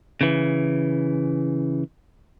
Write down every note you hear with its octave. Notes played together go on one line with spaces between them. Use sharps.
C#3 E3